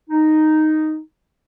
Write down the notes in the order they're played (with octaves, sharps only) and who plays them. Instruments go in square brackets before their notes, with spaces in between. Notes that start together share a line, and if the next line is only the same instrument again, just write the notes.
[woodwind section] D#4